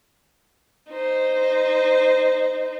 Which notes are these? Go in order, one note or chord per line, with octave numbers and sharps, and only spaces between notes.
D#4 C5